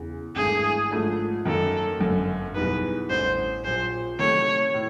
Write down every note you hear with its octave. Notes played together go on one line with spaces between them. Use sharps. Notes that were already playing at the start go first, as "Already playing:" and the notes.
Already playing: E2 C#3
G#1 G2 E3 A3 D4 G#4
G#2 F3 A3 D4
F#2 D#3 F#3 A#3 A4
G1 F#2 D3
E2 B2 G3 B3 D#4 B4
A1 G2 D3 C5
A#1 A#2 F#3 C5
C3 D#3 F#3 A3 C#5
A2